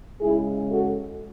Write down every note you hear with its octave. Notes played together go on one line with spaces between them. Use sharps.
C#3 G#3 E4 G#4
F#4 A4